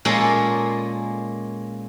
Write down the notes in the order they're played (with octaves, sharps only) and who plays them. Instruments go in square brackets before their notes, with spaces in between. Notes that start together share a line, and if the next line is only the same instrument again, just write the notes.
[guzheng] A#2 G#3 A#3 C#4 A4